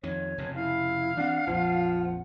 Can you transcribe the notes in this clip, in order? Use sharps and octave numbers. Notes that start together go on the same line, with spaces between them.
F2 D#3 C#5
F1 F2 C#3
E4 F5
E3 C4 D4 F#5
A#1 F2 F3